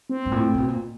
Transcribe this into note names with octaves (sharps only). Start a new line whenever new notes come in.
C4
G#2
A#2
A2
A#2
B2
A#2